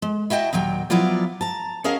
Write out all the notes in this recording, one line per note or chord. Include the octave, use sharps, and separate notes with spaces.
G#3
E4 F#4 D#5 G5 A5
D#2 A#2 F#3 G5
F3 F#3 B3 E4 F4 D5
A5 A#5
C#4 F#4 G#4 A#4 D#5 F5